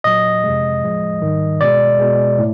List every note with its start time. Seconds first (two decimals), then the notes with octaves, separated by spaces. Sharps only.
0.04 A#2 F#3 D#5
0.44 F2 C3 F3 G#3
0.83 A2 F3 G#3
1.22 G#2 D#3 G3
1.61 B2 G#3 D5
2.00 B2 G#3
2.39 A2